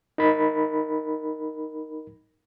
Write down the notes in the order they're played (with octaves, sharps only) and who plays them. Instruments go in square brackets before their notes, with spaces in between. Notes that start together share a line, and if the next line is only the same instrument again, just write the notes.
[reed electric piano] D#4 A#4 B5